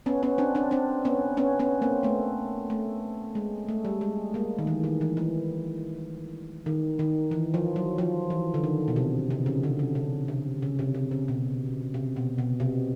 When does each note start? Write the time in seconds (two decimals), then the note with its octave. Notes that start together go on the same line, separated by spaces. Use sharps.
0.06 B3 C#4
0.23 B3 C#4
0.38 C4 D4
0.55 C4 D4
0.71 C4 D4
1.05 B3 C#4
1.37 B3 C#4
1.59 B3 C#4
1.82 A#3 C4
2.03 A3 B3
2.70 A3
3.35 G#3
3.69 A3
3.85 G3
4.01 G#3
4.34 G#3 A#3
4.59 D#3
4.67 E3
4.84 D#3
5.01 E3
5.17 E3
6.66 D#3
6.99 D#3
7.31 E3
7.54 F3
7.76 F#3
7.98 F3
8.30 E3
8.54 D3
8.64 D#3
8.88 B2
8.96 C3
9.30 C3
9.46 C#3
9.63 D3
9.79 C#3
9.95 C3
10.28 C3
10.62 C#3
10.79 C3
10.94 C3
11.11 C#3
11.28 B2
11.94 C3
12.16 B2
12.38 B2
12.60 C3